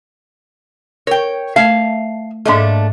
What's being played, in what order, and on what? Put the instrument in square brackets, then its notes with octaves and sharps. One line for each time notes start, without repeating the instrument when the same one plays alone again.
[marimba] A#4 [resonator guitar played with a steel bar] C#5 G5
[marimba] A3 G#6 [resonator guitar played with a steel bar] E5 F5 A5
[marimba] G#2 D#5 [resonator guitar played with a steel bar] A3 A#3 D4